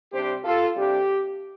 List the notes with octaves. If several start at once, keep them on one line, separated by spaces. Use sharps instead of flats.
C3 G3 D4 G4 C5
F4 A4
C3 G3 D4 G4